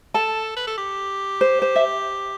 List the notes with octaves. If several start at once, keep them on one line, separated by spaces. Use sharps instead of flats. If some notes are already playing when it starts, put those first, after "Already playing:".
A4 A5
B4
A4
G4
C5
C5
E5